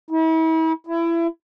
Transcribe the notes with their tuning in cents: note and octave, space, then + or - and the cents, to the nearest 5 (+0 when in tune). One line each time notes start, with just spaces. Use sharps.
E4 -40
E4 +25